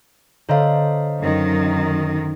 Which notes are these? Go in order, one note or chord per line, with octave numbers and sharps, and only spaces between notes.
D3 C5 C#5 D#5 F5 A#5
F#2 D#3